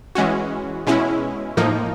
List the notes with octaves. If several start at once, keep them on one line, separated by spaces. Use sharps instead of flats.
E3 G#3 C#4 F#4
B2 G#3 C#4 E4
A2 F3 A#3 D#4